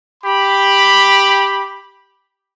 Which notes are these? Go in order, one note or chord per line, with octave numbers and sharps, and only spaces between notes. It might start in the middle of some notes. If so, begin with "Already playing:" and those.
G4 B5